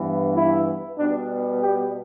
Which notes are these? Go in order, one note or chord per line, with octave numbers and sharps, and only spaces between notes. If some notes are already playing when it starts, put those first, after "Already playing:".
Already playing: G2 E3 B3
E4
B2 G3 B3 D4
G4